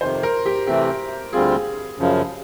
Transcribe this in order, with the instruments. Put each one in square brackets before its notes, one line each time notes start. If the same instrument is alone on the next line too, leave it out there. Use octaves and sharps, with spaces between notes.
[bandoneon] F2 C3 D#3 [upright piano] C5
[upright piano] A#4
G4
[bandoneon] C3 E3 A3 C4 [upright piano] G4
[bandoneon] D2 D3 G3 C4 F4 [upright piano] G#4
[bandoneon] F#2 C#3 F3